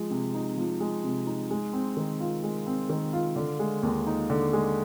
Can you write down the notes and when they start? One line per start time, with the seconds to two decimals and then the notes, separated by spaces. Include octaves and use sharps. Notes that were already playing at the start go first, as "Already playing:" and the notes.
Already playing: F3 G#3
0.10 C3
0.34 D#4
0.57 F3
0.81 G#3
1.04 C3
1.27 D#4
1.51 G#3
1.73 C4
1.97 D#3
2.20 F4
2.44 G#3
2.67 C4
2.89 D#3
3.13 F4
3.36 D3
3.59 G#3
3.83 D#2
4.07 D#4
4.30 D3
4.53 G#3